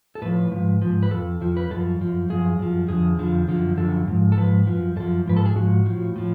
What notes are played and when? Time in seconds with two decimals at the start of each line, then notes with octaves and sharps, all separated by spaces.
0.15 A4
0.22 A2 F3 B4
0.52 G#2 F3
0.82 G#2 F3
1.03 B4
1.11 F2 F3 A4
1.41 F2 F3
1.57 B4
1.70 F#2 F3 A4
2.01 F#2 F3
2.29 F#2 F3 G#4
2.59 F#2 F3
2.89 F2 D3 F3 G#4
3.19 F2 D3 F3
3.48 F#2 D3 F3
3.78 F#2 D3 F3 A4
4.07 G#2 F3
4.32 A4
4.37 G#2 F3 B4
4.67 F#2 F3
4.96 F#2 F3 A4
5.26 G#2 F3 B4
5.37 A4
5.46 G#4
5.56 G#2 F3 F#4
5.86 A2 F3
6.16 A2 F3